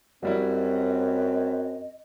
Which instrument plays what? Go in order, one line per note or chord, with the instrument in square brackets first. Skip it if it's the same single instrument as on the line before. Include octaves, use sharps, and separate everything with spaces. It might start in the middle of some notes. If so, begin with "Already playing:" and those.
[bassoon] F#2 [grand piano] F#3 G3 E4 [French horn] C4 [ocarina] D#5